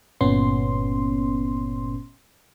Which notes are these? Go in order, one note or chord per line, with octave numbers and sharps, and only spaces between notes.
G1 A#2 B3 C#4 C6